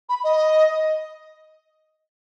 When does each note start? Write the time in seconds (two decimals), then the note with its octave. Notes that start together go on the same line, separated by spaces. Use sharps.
0.09 B5
0.24 D#5